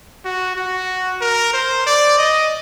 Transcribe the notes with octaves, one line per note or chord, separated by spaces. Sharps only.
F#4
F#4
A#4
C5
D5
D#5